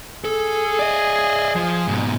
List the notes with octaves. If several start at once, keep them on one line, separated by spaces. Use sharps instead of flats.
G#4 A4
D5 D#5
F3
G#2 B2